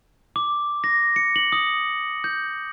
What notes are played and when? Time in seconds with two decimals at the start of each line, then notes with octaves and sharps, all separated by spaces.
0.36 D6
0.84 A#6
1.16 C#7
1.36 F#7
1.52 D#6
2.24 G6